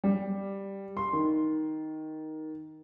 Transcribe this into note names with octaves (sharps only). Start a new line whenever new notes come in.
G3
C6
D#3